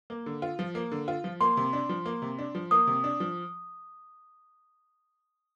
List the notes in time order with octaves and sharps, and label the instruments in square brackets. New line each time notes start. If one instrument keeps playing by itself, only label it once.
[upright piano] A#3
D3
F4
F3
A#3
D3
F4
F3
[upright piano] A#3 [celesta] C6
[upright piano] C3
D4
F3
A#3
C3
D4
F3
[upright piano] A#3 [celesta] D#6
[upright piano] C3
D4
F3